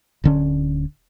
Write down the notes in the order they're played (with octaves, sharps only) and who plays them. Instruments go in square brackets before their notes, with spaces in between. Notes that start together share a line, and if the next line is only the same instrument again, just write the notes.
[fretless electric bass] D1 D3 C#4